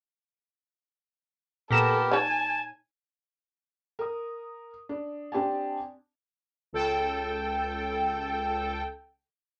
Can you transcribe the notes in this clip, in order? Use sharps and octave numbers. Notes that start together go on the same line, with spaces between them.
A#2 B3 G4 A4 A#4 A#6 E7
D#4 C#5 G#5 A5
A#4 D#6
D4
C4 D4 G4 D5 G#5 A5
C#2 A4 G5